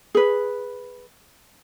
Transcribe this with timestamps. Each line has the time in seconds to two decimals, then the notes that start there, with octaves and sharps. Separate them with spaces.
0.15 G#4 B4